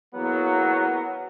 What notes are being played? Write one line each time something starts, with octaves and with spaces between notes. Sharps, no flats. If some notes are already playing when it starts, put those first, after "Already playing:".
E2 F#3 A#3 B3